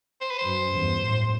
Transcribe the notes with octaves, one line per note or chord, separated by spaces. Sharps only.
C5
B4
F#2 C5
E2 G2
F#2 A2